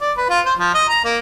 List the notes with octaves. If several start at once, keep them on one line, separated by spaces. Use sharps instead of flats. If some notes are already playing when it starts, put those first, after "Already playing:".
D5
B4
F4
C5
F3
D#5
A#5
A#3